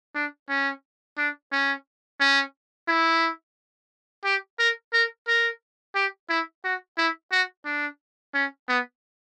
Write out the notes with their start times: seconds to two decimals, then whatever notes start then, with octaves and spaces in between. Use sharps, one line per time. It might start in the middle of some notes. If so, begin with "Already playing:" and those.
0.15 D4
0.49 C#4
1.18 D4
1.52 C#4
2.20 C#4
2.88 E4
4.25 G4
4.59 A#4
4.93 A#4
5.28 A#4
5.95 G4
6.29 E4
6.64 F#4
6.98 E4
7.32 F#4
7.66 D4
8.34 C#4
8.69 B3